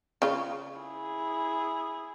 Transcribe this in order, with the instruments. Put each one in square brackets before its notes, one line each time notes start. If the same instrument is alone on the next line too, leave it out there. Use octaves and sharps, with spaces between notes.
[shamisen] C#3 F4
[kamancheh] E4 G#4